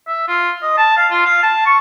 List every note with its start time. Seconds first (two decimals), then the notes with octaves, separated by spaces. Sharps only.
0.08 E5
0.28 F4
0.62 D#5
0.78 A5
0.97 F5
1.11 F4
1.26 F5
1.43 A5
1.66 C#6